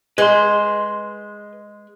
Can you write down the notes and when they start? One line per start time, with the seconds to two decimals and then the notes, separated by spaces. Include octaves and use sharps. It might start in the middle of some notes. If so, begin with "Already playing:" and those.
0.18 G#3 B4 C6